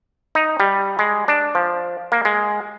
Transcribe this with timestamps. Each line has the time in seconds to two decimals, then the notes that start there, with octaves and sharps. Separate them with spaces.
0.35 D#4
0.60 G3
0.99 G#3
1.28 D4
1.55 F3
2.12 A#3
2.25 G#3